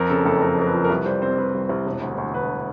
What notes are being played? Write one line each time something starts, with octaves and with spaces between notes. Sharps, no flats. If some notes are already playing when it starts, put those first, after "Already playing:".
Already playing: F2 A#4
C#3 A4
F#1 A4
F2 A#4
F2 A#4
B4
F3
A#4
C2 B4
G3 C5
C4 C5
G3 B4
C2
C2
E1
D2
D2
D2 B4